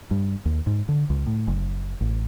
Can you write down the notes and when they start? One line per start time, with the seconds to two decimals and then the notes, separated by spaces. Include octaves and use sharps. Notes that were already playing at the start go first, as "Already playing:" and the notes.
0.11 G2
0.45 D#2
0.67 G#2
0.89 D3
1.10 C#2
1.27 A2
1.48 F#1
2.01 A1